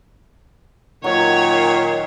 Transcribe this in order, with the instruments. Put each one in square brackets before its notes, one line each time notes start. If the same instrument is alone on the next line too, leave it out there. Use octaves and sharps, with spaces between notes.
[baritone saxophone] A#2 [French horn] D#3 [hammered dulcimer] F#3 [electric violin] C#5